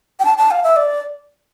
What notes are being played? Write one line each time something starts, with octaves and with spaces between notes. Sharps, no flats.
G5
A5
A5
F5
E5
D5